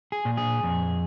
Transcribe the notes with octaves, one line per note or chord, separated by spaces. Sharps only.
G#4
A#2
G#4
F2